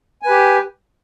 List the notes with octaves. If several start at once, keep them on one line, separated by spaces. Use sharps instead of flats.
G4 B4 G#5